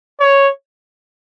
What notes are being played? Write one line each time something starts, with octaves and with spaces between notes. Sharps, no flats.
C#5